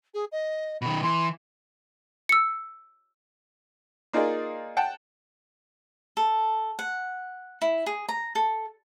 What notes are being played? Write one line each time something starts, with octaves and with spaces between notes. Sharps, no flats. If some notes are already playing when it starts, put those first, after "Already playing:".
G#4
D#5
B2 D#3 B5
E3 C6
E6 C#7
A#3 D#4 F4 G#4 D5 D#5
F#5 G5 A5
A4
F#5
E4
G#4
A#5
A4